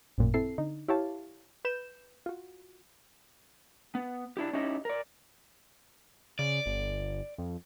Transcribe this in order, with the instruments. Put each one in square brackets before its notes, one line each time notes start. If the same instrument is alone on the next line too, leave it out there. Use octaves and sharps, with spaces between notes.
[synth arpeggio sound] A1 F#2 A#2
C4 E4 A4 C7
D3 D#4
E4 G4 C#5 F5 A5
B4 G6 E7
F4 F#4
[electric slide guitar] B3
D4 E4 G4
C#4 D#4 E4 G4 D#5
A#4 D5
[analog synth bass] C#3 [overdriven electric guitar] D5
[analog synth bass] G1
F2